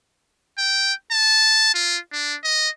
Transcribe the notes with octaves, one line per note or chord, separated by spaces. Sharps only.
G5
A5
F4
D4
D#5